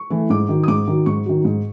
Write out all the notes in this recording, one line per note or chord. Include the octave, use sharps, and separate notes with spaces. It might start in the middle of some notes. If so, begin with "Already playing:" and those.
Already playing: C#6
E3 A3
G#2 D6
D#3 F#3
D#6
G#2 D6
D#3 F#3
G#2 C#6
D#3 F#3
G#2